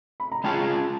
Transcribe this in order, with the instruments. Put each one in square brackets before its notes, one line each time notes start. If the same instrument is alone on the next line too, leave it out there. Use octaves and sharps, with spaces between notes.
[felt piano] B5
A#5
[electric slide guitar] G#3 C#4 F4 G#4 [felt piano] G5 A5